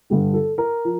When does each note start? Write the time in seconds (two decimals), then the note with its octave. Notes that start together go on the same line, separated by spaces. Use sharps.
0.10 G2 D3 G3 G4
0.34 A4
0.58 A#4
0.85 F3